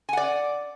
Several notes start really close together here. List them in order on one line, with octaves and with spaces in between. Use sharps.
G#5 F#5 D5